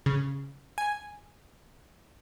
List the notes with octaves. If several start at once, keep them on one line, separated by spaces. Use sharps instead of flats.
C#3
G#5